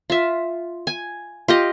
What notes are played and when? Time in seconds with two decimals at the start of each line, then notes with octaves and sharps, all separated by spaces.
0.10 F4 E5
0.87 G#5
1.48 F4 G4 D#5